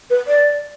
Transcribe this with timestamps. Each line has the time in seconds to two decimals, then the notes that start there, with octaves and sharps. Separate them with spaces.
0.10 B4
0.28 D5